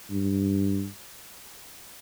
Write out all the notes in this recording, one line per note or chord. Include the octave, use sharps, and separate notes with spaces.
G2